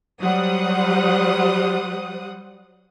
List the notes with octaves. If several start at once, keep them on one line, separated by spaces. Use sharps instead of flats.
F#3 G3 C5 F#5 D#6